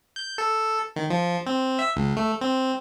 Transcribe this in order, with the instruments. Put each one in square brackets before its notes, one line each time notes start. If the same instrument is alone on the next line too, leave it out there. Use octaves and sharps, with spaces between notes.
[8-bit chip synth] G6
A4
D#3
F3
C4
E5
C#2
A3
C4